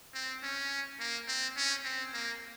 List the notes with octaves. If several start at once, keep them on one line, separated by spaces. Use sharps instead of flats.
C4
C#4
A#3
C4
C#4
C4
A#3